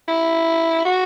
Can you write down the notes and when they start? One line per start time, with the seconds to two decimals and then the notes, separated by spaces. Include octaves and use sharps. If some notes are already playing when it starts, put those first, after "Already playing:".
0.08 E4
0.85 F#4